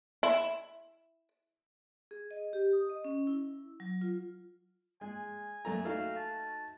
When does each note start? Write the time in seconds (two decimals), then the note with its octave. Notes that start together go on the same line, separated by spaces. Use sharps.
0.23 E4
2.11 G#4
2.31 D#5
2.53 G4
2.73 D#6
2.90 D#5
3.04 C#4
3.27 E4
3.80 F#3
4.01 F4
5.01 G#3 G#5
5.65 F#2 A3 A#5
5.85 A3 D#4 F#4 F5
6.16 A5